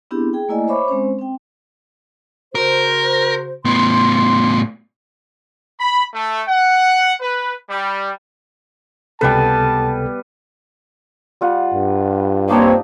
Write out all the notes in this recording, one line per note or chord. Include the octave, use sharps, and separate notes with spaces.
B3 C4 D4 E4 G4 G#4
G#4 G5
A3 A#3 E4 D5 D#5 G#5
C5 C#5 E5 B5 C#6 D6
G#3 C4 C#4 C5
C4 G5
C#3 F#4 A#4 C5
A2 B3 C6
B5
A3
F#5
B4
G3
C#2 C3 G3 B3 A4 B4 A5
G3 F4 F#5
G2
A#3 C4 D4 D#4 G4 C5 C#5